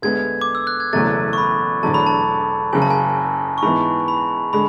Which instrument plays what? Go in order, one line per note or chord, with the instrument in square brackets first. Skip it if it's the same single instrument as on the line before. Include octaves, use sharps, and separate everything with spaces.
[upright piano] D2 D3 G#3 B3 [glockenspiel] G#6
[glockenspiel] D6
E6
F#6
G#6
[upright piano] F#1 E2 B2 F#3 A3 [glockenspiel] A6
[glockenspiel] C#6
B5
[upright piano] E1 E2 D3 F#3 A3 [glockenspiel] A5
[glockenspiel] B5
A5
[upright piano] F#1 F#2 C#3 F#3 [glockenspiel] G#5
[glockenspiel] A5
G#5
C#6
[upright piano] G#2 E3 B3 [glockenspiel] B5
[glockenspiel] B5
[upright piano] D3 G#3 [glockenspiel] B5